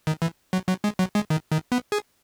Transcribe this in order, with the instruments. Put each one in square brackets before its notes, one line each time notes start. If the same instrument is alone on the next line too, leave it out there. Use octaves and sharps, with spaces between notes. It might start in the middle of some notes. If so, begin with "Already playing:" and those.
[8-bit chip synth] D#3
E3
F#3
F#3
G#3
F#3
G#3
D#3
D#3
B3
G#4